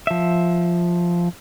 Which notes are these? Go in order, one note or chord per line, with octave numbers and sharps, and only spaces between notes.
F3 E5